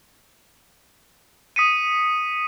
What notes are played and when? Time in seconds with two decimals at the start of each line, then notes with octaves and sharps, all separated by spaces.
1.56 D#6 B6 C#7 D#7